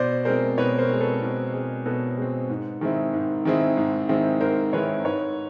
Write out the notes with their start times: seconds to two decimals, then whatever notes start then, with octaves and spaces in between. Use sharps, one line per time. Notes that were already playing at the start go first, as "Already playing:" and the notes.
Already playing: B2 C5 D5
0.25 G#3 C4 A#4 C5
0.58 B2 B4 C#5
0.79 A#4 C5
0.89 G#3 C4
1.00 A4 B4
1.22 B2
1.53 G#3 C4
1.85 B2 A4 B4
2.17 G#3 C4
2.49 G#2
2.81 D#3 G#3 C4 E4
3.13 G#2
3.45 D#3 G#3 C4 E4
3.77 G#2
4.09 D#3 G#3 C4 E4
4.41 G#2 A#4 C5
4.73 D#3 G#3 C4 E4 B4 C#5
5.05 G#2 B4 C#5